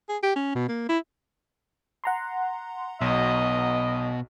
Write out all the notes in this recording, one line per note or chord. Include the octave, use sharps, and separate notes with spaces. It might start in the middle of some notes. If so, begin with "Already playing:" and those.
G#4
G4
C#4
B2
A#3
E4
F#5 A#5 C6
B1 B2 D#5